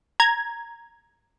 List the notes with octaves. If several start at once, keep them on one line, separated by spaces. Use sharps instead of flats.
A#5 G#6